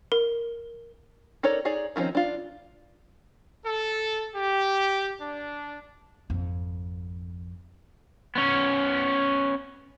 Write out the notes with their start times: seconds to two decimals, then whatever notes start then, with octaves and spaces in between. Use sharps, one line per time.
0.12 A#4
1.43 D#4 A4 A#4 C#5 D5
1.65 D#4 G#4 C#5 D5
1.96 D#3 F3 C4 C#4 D#4
2.15 D4 F4
3.64 A4
4.34 G4
5.20 D4
6.30 G#1 F2
8.35 B3 C#4